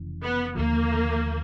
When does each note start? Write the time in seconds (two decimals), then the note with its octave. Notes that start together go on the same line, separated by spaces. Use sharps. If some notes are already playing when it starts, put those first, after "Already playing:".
Already playing: F1 C#3 E3
0.22 B3
0.55 D#2 D3 F3 A#3